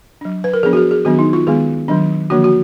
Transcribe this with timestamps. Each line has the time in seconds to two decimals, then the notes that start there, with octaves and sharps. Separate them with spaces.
0.21 F#3 D4
0.44 B4
0.54 A#4
0.63 F3 B3 D4 G#4
0.73 F#4
0.77 G#4
0.91 G#4
1.05 D#3 F#3 B3 D4 F#4
1.19 D#4
1.33 F4
1.47 D#3 G#3 B3 G#4
1.88 D#3 F#3 D4
2.30 D3 F3 A#3 D4 F#4
2.44 F#4